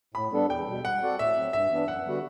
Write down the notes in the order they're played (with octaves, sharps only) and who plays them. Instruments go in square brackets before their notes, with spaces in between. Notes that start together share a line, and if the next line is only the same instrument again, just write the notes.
[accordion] A2 [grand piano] B5
[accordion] G3 B3 D4 A4
[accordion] E2 [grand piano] G5
[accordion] B2 G3
[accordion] G3 [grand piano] F#5
[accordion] C4 F#4 A4 D5
[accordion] A2 [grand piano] E5
[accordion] F#3 C4
[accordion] G2 [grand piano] E5
[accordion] E3 B3 D4
[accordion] F#2 [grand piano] F#5
[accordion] D3 G3 B3 F#4